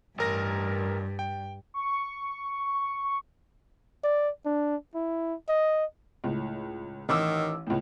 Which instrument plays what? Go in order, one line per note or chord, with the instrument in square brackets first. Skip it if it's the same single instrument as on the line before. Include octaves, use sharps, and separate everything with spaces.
[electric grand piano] A1 A#4 A#6 [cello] G2
[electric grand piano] G5
[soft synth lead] C#6
[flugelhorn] D5
D4
E4
D#5
[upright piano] C#2 A2
[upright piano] A1 D6 E6 [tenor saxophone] D#3
[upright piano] C#2 A2